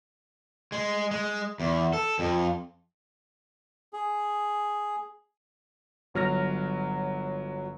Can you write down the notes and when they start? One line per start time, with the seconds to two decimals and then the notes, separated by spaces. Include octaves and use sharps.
0.72 G#3
1.11 G#3
1.60 E2
1.93 A4
2.19 F2
3.93 G#4
6.14 G1 F#3 F6 A#6